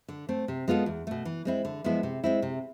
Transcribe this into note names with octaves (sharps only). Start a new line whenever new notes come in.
D3
A3 C4
C3
G#3 B3 F4 A4
E2
B2 A3
E3
G#3 C4 E4
D3
F3 G#3 B3 E4
C3
G#3 C4 E4
C3